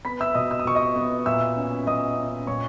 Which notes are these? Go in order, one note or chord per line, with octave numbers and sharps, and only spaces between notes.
B3 B5 B6
E5 E6
B2 D#5 D#6
E6
D#6
B2 C#6
D#5 D#6
B3
A#2 E5 E6
C#4
A#2 D#5 D#6
C#4
A#2 C#5 C#6